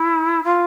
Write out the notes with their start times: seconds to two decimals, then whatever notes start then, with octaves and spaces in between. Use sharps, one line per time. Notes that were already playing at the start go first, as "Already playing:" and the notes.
Already playing: E4
0.43 F4